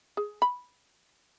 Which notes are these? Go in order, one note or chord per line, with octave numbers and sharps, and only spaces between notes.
G#4
B5